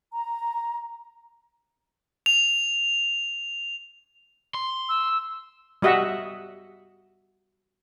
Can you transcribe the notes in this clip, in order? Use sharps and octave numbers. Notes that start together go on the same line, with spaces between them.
A#5
F7
C6
E6
G3 F#4 D#5 E5 F#5